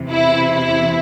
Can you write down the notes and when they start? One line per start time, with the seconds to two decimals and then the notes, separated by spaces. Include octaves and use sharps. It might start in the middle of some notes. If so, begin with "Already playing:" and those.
Already playing: E2 C3 E3
0.10 E4
0.52 E4